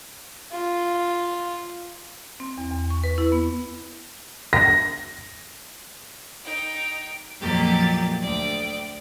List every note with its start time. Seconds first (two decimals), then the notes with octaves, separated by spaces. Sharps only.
0.52 F4
2.40 C4
2.58 E2
2.70 E2
2.90 C#6
3.04 B4
3.18 E4
3.32 B3
4.53 A#6
6.43 D#4 G5
7.41 F2 A#2 F#3 A#3 G4 A6
8.21 D2 D5 G5